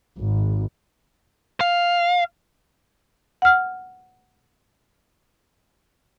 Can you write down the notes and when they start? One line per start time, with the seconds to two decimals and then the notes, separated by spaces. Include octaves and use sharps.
0.18 G#1
1.61 F5
3.42 F#5 F6